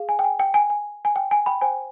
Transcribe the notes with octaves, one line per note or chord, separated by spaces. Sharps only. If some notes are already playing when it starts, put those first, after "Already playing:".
Already playing: G#4 F5
G#5
G5
G#5
G5
G#5
G#5
G#5
G5
G#5
G5 B5
C5 G5 G#5